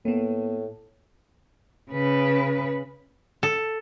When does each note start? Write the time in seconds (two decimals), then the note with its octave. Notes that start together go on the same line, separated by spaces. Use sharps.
0.05 A2 A#3 B3
1.92 C#3 B4
3.43 A4